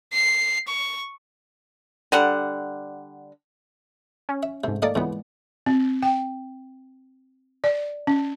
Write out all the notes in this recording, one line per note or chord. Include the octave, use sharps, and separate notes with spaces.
C7
C#6
D3 G3 F#5
C#4
E5
G#2 C3 A3
A#3 A4 D5 D#5
C#2 A2 E3 G#3 B3
C4
G5
D5
C#4